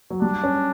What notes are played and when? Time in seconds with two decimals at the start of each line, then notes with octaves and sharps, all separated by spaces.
0.10 F#3
0.22 G3 D4
0.44 C#4